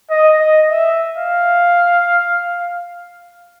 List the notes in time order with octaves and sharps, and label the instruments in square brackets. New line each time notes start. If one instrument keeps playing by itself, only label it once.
[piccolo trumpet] D#5
D#5
E5
F5